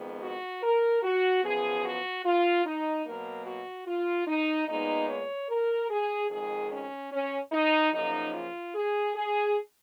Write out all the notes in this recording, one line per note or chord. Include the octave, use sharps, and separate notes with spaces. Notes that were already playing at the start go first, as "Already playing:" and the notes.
Already playing: F2 D#3 G#3 B3
F#4
A#4
F#4
F#2 F3 B3 G#4
F#4
F4
D#4
B2 F#3 A#3 A#4
F#4
F4
D#4
A#2 G#3 B3 D#4
C#5
A#4
G#4
F2 D#3 G#3 G#4
C#4
C#4
D#4
F#2 C#3 F3 A#3 D#4
F4
G#4
G#4